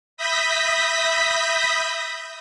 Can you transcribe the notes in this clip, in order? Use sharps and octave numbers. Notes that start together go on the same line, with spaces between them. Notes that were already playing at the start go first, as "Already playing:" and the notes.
E5 B5 D#6 G6 A#6 B6